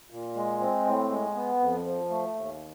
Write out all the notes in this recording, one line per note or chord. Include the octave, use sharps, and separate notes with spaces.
A#2
G#3
C4
A2
G#3
B3
F2
F3
A3
D#2